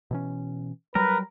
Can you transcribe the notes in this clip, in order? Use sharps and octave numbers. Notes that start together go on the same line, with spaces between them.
B2 E3 C#4
F#3 G3 A#4 B4